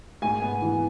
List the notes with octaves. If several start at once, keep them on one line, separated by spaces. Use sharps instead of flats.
G#2 G#5
B3
E3